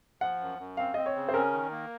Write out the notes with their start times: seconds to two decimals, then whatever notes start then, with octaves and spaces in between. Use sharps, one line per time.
0.21 F3 F#5
0.41 F#2
0.59 F#2
0.77 C4 F5
0.94 C4 D#5
1.06 C#5
1.15 C#3
1.28 C5
1.34 C#4 A#4
1.52 D#3
1.71 A#3